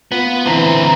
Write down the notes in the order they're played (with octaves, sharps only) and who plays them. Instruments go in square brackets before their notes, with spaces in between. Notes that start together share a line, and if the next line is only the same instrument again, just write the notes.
[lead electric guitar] B3 [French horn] F4
[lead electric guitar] D3 C4 [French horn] E3 [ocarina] A#5